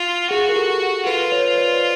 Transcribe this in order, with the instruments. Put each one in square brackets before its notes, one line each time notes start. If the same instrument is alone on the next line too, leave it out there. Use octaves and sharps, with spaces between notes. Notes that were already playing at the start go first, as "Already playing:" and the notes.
Already playing: [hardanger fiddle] F4
[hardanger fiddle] F#4 [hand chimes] G#4
[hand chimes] A#4
G4 A4
G#4 A#4
[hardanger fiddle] F4 [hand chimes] A4 B4
[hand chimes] B4 C#5
C5 D5